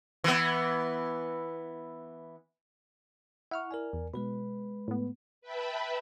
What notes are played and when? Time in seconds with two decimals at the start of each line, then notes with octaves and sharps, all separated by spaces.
0.24 E3 B3
3.51 E4 F#5 C#6 F6
3.71 A#4 D5 G#5
3.93 E2
4.14 B2 G#3 B4 B5
4.88 A2 B3
5.41 B4 E5 G5 A5 B5